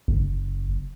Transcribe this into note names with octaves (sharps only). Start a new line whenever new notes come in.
F#1